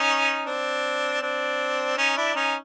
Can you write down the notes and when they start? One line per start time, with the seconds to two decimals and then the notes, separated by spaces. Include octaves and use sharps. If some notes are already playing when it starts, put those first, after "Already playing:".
Already playing: C#4 D#4
0.46 C4 D4
1.21 C4 D4
1.97 C#4 D#4
2.17 D4 E4
2.35 C#4 D#4